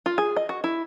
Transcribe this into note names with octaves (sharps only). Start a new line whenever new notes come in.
F4
G#4
D#5
F#4
E4